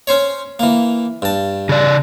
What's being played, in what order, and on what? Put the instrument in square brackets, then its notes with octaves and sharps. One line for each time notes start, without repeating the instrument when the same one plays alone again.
[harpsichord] C#4 C5 C#5
E3 A#3
G2 A5
[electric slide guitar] C#3 D5